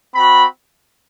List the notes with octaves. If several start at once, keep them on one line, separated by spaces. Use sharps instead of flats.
C4 F#4 B5